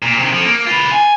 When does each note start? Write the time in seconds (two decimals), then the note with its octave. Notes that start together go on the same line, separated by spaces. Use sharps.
0.02 A#2
0.19 C3 D#3
0.33 F3 A4
0.45 A#3
0.67 F4 B4
0.91 G#5